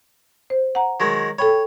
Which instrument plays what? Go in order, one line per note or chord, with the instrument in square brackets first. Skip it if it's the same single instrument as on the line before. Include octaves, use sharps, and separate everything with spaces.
[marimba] C5
F#5 A#5
[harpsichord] D#3 F#3 G#3
[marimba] A4 G5 B5 [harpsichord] C#5